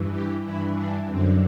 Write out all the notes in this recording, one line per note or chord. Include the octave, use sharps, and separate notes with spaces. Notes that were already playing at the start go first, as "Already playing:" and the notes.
Already playing: G2 E3
G4
G2 E3 E4
D4
F#2 D3 C4